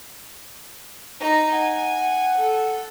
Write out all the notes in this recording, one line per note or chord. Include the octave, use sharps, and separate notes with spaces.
D#4 A#5
F#5 G#5
A4